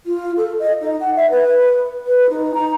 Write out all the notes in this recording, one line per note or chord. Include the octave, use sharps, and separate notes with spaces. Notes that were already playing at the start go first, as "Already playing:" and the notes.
F4
A4
D#5
D#4
F#5
E5
B4
B4
D#4
A#5